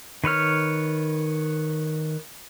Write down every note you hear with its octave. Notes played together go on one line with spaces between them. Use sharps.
D#3 B4 C#5 F6